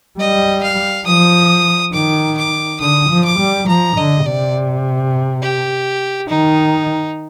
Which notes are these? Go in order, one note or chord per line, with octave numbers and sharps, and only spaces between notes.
G3 D#5
F5
F3 D#6
D#3 D6
D6
D3 D#6
F3
D6
G3
F3 A#5
D3 D#5
C3 D5
G4
D#3 D#4